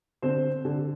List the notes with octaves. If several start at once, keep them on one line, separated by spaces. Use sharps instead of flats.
D3 C4 C5
D3